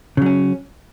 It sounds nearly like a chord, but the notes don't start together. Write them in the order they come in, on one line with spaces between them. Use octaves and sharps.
C#3 F#3 C#4